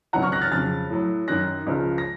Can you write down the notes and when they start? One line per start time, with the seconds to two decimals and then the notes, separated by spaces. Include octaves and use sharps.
0.13 C#2 C3 D#3 F#3 F#5 A#5
0.22 C#6 F6
0.32 F#6 A#6
0.41 F6 A6
0.52 F2 C#3 F#3 F6 A6
0.90 A2 F#3
1.28 F#2 D#3 F#3 F#6 A#6
1.67 C#2 C#3 F3
1.98 A#6